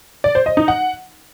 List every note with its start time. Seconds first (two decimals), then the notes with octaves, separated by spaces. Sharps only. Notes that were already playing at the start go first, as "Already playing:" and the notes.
0.24 D5
0.35 C5
0.46 D#5
0.57 D#4
0.68 F#5